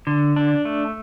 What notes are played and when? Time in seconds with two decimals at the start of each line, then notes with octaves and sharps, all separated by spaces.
0.07 D3
0.36 D4
0.65 A3